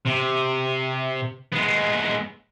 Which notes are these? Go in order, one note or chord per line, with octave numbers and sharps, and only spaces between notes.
C3
G#3 B3